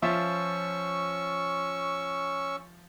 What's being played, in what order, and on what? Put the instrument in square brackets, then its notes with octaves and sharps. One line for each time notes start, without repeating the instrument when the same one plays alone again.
[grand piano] F3 F4 E5 [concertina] C#4 C#6 E6